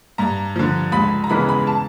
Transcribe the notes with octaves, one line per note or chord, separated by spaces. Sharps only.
G2 A#5
D3 F3
C#2 B5
A#5
C#3 E3 G#3 B3 B5
B5
A5